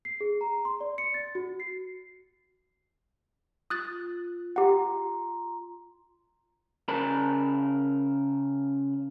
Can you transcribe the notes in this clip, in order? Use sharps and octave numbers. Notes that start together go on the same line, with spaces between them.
C7
G#4
A#5
C6
D5
C#7
A6
F#4
C7
F4 D#6 F#6 A6
F4 G4 F#5 A#5 C6
C#3 A#4 A5 B5